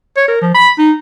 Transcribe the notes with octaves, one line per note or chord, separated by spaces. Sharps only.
C#5
A#4
F3
B5
D#4